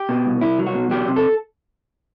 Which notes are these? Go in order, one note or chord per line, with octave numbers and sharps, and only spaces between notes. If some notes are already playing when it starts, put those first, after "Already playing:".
Already playing: G4
B2
C2
C2 E4
F#3
F#4
B2
F#3 G4
C3
A4